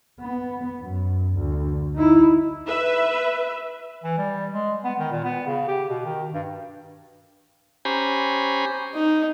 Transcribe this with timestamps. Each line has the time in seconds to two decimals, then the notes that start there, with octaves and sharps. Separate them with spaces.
0.21 B3
0.81 F#2
1.38 D2
1.95 D#4 E4
2.66 B4 E5
4.04 E3
4.18 G3
4.53 G#3
4.84 B3
4.99 D#3
5.11 A#2
5.24 B3
5.47 C#3
5.68 G4
5.89 B2
6.05 D#3
6.34 G2
7.85 C#4 G4 C5 G#5 A#5 B5
8.94 D#4